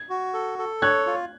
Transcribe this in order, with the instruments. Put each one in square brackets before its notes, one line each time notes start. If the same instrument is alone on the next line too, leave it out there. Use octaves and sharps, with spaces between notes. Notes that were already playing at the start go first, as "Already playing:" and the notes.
Already playing: [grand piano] G#6
[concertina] F#4
A4
A4
[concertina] C#5 [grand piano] F#6 G#6
[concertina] F4